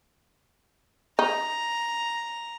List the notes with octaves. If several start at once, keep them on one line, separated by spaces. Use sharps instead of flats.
D#4 A#5